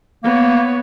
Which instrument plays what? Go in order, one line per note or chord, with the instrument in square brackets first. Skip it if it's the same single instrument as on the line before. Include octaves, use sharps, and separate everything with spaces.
[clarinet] A#3 [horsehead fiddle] B3 C#5